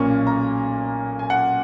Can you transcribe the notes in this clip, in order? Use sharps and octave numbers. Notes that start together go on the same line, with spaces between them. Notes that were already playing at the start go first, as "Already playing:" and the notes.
Already playing: B1 A#2 A#3 C#4 C#6
A#5
G#5
F#5